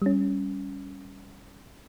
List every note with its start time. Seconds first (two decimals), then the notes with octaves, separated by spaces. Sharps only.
0.02 G3 C#4